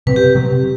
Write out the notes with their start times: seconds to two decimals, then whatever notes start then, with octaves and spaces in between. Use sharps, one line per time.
0.07 C3 F#3 C4 B4
0.16 G4
0.35 C3 F#3 C4